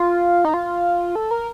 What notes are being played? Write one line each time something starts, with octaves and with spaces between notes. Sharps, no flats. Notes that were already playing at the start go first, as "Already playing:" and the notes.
Already playing: F4
D#4
F4
A4
A#4